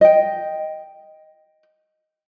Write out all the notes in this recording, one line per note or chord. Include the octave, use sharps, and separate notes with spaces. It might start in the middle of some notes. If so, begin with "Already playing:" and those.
D#5 G5